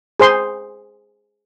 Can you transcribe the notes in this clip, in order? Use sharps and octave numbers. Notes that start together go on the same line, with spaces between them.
G#4 C5 C6